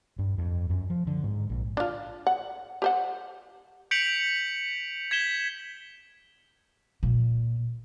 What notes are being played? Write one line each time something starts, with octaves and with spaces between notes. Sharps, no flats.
G2
F2
F#2
F3
D3
G#2
A#1
D4 F4
F#5
G4 C5 F#5
G6 B6 C#7 D7 F7 F#7
G#6 B6 E7 G7
A#2